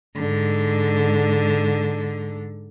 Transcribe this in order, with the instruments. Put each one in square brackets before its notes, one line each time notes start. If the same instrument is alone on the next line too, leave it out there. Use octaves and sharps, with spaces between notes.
[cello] G#2 D3